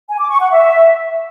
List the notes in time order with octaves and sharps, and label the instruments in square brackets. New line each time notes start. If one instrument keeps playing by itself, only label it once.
[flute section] G#5
D6
C#6
F#5
E5